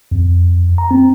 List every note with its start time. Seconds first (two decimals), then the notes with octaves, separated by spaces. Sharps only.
0.12 F2
0.78 A#5
0.91 C4